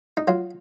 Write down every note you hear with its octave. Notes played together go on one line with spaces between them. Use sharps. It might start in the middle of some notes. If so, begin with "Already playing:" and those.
D#4
F#3 F4